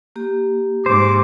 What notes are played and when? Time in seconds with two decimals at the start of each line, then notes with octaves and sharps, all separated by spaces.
0.16 A#3 G4
0.86 G#2 C5 D6